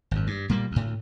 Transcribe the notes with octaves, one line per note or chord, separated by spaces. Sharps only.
G#1 F#2
G2
A#2 G3 A#3
D2 A2